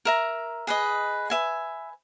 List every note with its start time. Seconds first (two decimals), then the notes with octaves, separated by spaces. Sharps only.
0.05 A#4 E5 A#5
0.67 G#4 B4 D#5
1.30 B4 E5 G#5